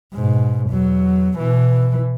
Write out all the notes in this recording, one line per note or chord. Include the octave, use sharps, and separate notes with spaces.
G#2 B2
E2 F#3
B2 E3